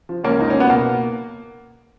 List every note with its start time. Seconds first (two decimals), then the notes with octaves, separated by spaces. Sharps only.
0.09 F3
0.24 C#2 A#3 C#4
0.39 C#2 D#4
0.50 F#3 C#4
0.60 B3
0.69 B2 A#3